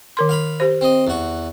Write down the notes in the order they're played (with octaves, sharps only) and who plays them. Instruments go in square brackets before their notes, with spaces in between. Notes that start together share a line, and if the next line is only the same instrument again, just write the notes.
[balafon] D#3 A#4 C6
[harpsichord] F5 B5
[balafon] G4 C5
[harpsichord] C4 D#5
E2 F#4